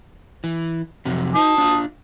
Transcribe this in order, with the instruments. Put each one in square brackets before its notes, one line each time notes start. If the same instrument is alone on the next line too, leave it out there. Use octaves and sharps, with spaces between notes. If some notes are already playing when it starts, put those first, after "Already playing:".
[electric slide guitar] E3
F2 C3 F#3
[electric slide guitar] D#4 [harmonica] A5 D#6
[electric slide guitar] D4 F4